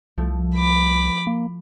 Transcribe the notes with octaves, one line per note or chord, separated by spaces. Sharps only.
C2 F3 A3 E4
B5 D6
A#3